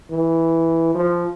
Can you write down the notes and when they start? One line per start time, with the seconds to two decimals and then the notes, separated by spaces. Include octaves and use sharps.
0.11 E3
0.95 F3